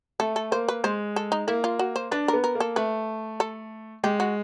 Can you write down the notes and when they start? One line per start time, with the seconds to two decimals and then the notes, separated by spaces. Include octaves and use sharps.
0.20 A3 A4
0.36 A4
0.51 A#3 C5
0.68 B4
0.84 G#3 C5
1.16 A4
1.32 D#4
1.47 A#3 E4
1.64 F4
1.79 F#4
1.96 C5
2.11 D4 B4
2.28 A#4
2.33 B3
2.44 A#4
2.55 A#3
2.60 A4
2.76 A3 B4
3.40 A4
4.03 G#3 G4
4.20 F#4